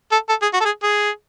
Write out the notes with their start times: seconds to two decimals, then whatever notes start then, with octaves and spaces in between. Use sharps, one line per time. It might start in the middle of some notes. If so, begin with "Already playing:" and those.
0.12 A4
0.29 A4
0.42 G#4
0.54 F#4
0.61 A4
0.65 G#4
0.83 G#4